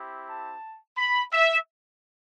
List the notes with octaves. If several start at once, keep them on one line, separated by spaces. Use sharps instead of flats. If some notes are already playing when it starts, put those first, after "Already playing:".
Already playing: C4 E4 G4
A5
B5
E5